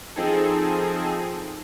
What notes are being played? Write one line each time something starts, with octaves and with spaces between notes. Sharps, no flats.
F3 C4 D#4 G#4 A4